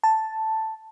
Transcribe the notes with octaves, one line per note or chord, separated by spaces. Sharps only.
A5